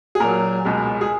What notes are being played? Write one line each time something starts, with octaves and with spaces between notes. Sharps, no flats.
G#4
A#2 F#3 A#4
C#2 B2 G#3
G#4